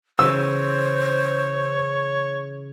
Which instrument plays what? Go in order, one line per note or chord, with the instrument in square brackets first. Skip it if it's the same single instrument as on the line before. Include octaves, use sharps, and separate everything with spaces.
[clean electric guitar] C#3 E3 [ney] C5 [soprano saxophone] C#5 [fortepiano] E6